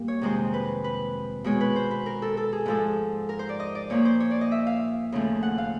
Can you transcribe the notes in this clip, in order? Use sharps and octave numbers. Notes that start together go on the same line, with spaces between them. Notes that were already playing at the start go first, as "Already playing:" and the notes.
Already playing: A#2 G3 A#3
C#5
F2 C3 D#3 G#3 C5
B4
B4
B2 G#3 C#5
B4
C5
B4
A#4
A4
A4
G#4
G#2 F3 G#3 A4
A#4
C5
D5
D#5
D5
A#2 F3 A#3 C#5
C5
C#5
D5
D#5
E5
F5
D#2 C#3 F3 A3
F#5
F5